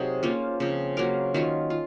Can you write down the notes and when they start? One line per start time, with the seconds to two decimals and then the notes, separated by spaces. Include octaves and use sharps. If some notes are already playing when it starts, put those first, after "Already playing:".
Already playing: C3 F#3 D#4 G#4
0.23 A#3 C#4 F4 C5
0.60 C#3 F3 C4
0.97 F#3 A#3 F4 A#4
1.34 D#3 F#3 C#4 F4
1.70 F4